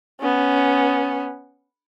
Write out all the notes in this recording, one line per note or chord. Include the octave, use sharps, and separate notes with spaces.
B3 C#4